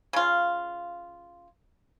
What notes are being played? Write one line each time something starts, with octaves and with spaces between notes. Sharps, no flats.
C#3 F4